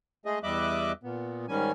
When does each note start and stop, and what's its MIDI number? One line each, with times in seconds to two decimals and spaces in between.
0.26 0.39 56
0.26 0.39 57
0.26 0.39 68
0.26 0.39 75
0.43 0.92 40
0.43 0.92 55
0.43 0.92 75
0.43 0.92 76
0.43 0.92 86
0.43 0.92 90
1.03 1.46 46
1.03 1.46 59
1.48 1.72 44
1.48 1.72 51
1.48 1.72 55
1.48 1.72 61
1.48 1.72 80